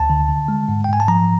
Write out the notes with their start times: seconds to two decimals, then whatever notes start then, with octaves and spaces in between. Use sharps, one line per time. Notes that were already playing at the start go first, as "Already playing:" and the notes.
Already playing: D2 A5
0.10 D3
0.28 D3
0.48 G#3
0.68 G#2
0.84 G5
0.88 G#2 G#5
1.00 A5
1.08 F3 A#5